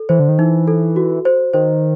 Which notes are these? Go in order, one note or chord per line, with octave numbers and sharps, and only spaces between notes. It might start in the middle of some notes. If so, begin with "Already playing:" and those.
Already playing: A4
E3 C5
D3
D#3
E3 D#4
A4
F#4
C5
D#3 C5